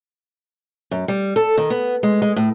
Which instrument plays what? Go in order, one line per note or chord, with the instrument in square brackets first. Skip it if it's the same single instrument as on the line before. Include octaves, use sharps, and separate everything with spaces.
[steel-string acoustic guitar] F#2
G3
A4
D#3
B3
G#3
G#3
A2